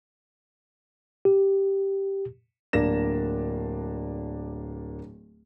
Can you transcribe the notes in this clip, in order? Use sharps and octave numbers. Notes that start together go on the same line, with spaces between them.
G4
D1 A#3 D4 A#6 E7